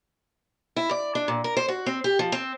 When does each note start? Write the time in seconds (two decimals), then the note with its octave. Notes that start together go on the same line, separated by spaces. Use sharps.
0.76 E4
0.91 D5
1.15 D4
1.28 A#2
1.44 A#4
1.57 C5
1.68 F#4
1.86 C4
2.04 G4
2.19 F3
2.32 C4